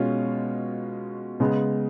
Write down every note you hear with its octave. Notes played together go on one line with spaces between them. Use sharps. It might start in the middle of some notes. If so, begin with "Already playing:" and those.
Already playing: B2 G#3 C#4 F4
C#3 G#3 B3